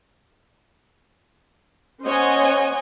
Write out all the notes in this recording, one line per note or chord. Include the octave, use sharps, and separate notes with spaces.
C#4 C5 C#5 D#5 F#5 G#5